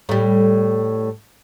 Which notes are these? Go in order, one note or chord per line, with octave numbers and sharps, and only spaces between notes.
A2 G3